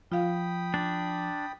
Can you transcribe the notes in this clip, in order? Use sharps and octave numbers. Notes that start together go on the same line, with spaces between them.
F3 F4 F5 G5 B5 D#6
D4